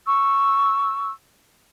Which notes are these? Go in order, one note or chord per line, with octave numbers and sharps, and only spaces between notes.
C#6 E6